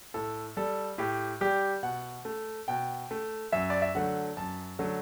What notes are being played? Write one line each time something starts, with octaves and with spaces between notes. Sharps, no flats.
A2 A4
G3 A4
A2 G4
G3 G4
B2 F#5
A3
B2 G5
A3
F#2 E5
D5
E5
D3 F#3 A3 F#5
F#2 A5
D3 F#3 A3